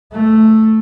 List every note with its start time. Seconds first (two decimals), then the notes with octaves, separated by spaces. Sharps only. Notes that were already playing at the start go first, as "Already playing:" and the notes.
0.13 A3